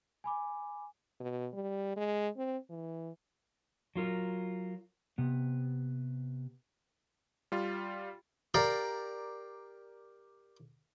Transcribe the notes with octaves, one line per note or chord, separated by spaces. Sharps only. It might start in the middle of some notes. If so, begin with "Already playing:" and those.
G#5 B5 D6
B2
G3
G#3
C4
E3
F#3 F4 A#4
C3 B3
G3 F4
G4 A#4 D5 F5